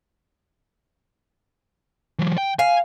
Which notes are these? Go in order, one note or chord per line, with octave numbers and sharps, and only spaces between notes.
E3 F#3
G5
F5 G#5